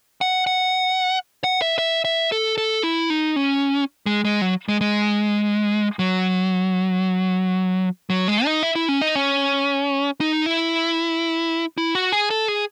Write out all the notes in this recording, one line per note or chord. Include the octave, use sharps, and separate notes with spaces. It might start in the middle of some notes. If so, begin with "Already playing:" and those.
F#5
F#5
F#5
E5
E5
E5
A4
A4
E4
D#4
C#4
G#3
G#3
F#3
G#3
G#3
F#3
F#3
G#3
D#4
E4
E4
C#4
D#4
C#4
D#4
E4
E4
F#4
G#4
A4
G#4